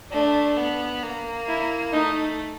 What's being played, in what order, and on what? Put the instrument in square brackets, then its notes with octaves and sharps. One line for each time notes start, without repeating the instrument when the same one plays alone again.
[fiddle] A3 [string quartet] D4
[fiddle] B3
A#3
[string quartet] E4
[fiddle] A3 [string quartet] D#4